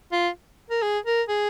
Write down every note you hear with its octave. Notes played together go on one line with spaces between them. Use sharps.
F4
A#4
G#4
A#4
G#4